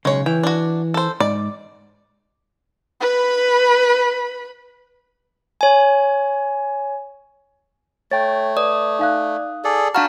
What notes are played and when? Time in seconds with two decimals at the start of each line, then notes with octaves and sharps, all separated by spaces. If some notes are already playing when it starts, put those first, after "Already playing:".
0.05 B1 C#3 G#3 C#5
0.26 E3 G5
0.43 D4 F#4
0.94 A4 C5
1.20 G#2 D5
3.00 B4 B5
5.61 C#5 G#5
8.11 A3 C#5 G5 A6
8.57 B4 D5 D#6
8.99 D#4 F5 F#6
9.64 G#4 A4 D5
9.95 D4 F#4 F5 F#5 A5 A#5 F6